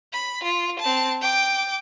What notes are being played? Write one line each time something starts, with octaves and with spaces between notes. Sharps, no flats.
B5
F4
C4 A5
G5 D6